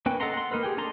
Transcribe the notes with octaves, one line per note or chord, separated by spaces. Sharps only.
A#3 C#4 B4 G5
A4 D#5 F#5 A#5 C6
F#5 C6
A#3 D#4 A#4 B4
G4 G#4 G5
D4 D#4 A4 A#5 C6